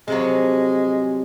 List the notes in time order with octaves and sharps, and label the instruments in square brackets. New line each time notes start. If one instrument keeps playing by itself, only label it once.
[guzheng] C3 F3 F#3 [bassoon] G#3